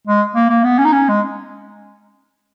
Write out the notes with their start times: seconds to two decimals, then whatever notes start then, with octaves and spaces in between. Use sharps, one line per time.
0.07 G#3
0.35 A#3
0.49 A#3
0.64 B3
0.78 C#4
0.85 D#4
0.93 C#4
1.09 G#3